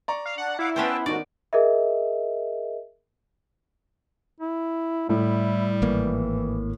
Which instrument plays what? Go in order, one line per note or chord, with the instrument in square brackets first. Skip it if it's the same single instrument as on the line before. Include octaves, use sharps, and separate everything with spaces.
[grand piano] D5 A#5 C#6
[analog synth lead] F5
[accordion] D4 [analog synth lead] F#5
[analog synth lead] E4 [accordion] F5 F#5 D6
[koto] B3 C#4 C5 [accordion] B4 G5 A5
[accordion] G#2 A3 F#4 [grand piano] D#3 D#4 A#4 [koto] D5
[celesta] G#4 A#4 D#5 E5
[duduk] E4
[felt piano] A2 [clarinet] G3 [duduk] E4
[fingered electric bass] G#1 A#3 [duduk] E3